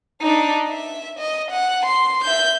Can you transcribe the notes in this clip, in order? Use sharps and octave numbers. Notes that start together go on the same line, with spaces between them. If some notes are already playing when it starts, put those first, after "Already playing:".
D4 D#4
E5
D#5
F#5
C6
E5 G6